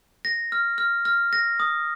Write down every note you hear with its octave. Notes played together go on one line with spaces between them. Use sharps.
A#6
F6
F6
F6
A#6
D#6